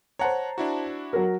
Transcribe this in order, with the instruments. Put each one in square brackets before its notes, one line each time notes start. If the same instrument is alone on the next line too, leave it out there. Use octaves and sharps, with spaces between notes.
[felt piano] C5 A5 A#5 [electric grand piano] C#5 F#5
[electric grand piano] D4 E4 F#4
[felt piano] F#3 A#4